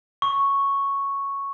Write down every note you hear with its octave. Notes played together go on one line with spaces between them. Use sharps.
C#6